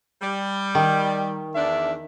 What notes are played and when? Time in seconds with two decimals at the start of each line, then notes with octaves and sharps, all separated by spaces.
0.22 G3
0.75 D#3
1.55 E2 D4 E5